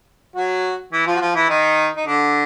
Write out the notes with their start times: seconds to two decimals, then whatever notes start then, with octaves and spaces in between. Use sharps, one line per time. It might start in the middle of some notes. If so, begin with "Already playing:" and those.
0.35 F#3 F#4
0.92 E3 E4
1.07 F3 F4
1.15 F#4
1.21 F3 F4
1.35 E3 E4
1.49 D#3 D#4
1.96 D#4
2.06 D3 D4